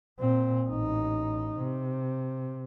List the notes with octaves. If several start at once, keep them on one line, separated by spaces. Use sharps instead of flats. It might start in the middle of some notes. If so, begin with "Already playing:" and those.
A#2 C4
A1 D#4
C3